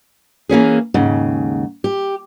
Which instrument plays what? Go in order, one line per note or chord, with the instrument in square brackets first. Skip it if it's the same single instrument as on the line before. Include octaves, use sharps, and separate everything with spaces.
[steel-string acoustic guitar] E3 A#3 C#4 G#4
D#2 G#2 C#3
G4